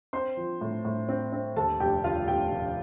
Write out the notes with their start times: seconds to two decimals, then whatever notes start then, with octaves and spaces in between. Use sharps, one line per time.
0.13 C4 C5 C6
0.37 F3
0.61 A2
0.85 A2
1.09 C4
1.32 C4
1.56 D#2 A4 A5
1.80 F1 G4 G5
2.04 D#2 F4 F5
2.28 F1 G4 G5
2.52 F1